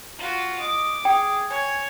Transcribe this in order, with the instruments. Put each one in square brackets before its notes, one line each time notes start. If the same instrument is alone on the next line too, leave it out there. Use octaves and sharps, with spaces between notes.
[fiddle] F4 F#4
[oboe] D#5 [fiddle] D6
[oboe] G#4 [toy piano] G5
[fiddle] C#5 [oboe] G#5